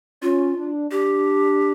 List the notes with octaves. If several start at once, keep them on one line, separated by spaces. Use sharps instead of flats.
C#4 F4
D4
D4 G4